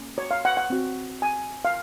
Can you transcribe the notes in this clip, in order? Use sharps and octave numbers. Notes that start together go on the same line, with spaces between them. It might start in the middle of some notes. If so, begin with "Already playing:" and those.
Already playing: A#3 C#4
C#5
F5
F#5
F#5
C4 F#4
G#5
F5